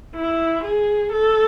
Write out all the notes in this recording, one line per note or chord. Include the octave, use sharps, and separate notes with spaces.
E4
G#4
A4